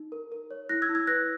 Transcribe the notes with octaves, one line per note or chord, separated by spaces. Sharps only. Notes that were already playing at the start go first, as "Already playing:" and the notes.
Already playing: D#4
A#4
A#4
C#5
E4 F#6 A#6
E6 G#6
E4
E6 G#6
B4 F#6 A#6